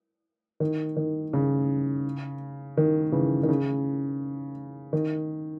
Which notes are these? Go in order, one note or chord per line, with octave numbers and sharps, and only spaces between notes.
D#3
D#3
C#3
D#3
C#3 E3
D#3
C#3
D#3